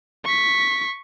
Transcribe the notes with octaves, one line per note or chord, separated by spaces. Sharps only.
C#6 B6